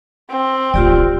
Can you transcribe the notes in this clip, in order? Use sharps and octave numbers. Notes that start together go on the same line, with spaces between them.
C4
D1 A#1 F4 G4 D5